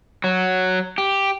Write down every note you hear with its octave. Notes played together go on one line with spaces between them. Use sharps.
F#3
G4